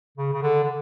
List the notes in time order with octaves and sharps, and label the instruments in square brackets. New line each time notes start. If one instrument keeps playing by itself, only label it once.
[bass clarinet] C#3
C#3
D3
D3